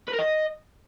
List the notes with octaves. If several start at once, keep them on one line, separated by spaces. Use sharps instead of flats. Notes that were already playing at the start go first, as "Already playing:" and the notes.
B4
A#4
D#5